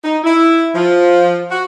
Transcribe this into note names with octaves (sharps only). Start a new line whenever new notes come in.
D#4
E4
F3
F#4